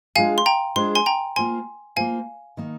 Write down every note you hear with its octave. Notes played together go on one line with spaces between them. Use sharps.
G#3 D4 F4 G#4 C5 F5 G#5
C6
G5 A#5
G#3 D4 F4 G#4 C5 C6
G#5 C6
G5 A#5
A#3 F4 C5 G#5 C6
A#3 F4 C5 F5 G#5
D#3 A#3 D#4